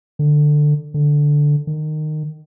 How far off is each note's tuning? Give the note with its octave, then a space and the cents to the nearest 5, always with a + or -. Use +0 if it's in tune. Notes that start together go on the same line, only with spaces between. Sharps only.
D3 +15
D3 +0
D#3 -20